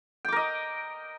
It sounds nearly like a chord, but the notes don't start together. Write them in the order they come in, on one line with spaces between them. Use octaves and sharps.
G5 D6 A#4 D#5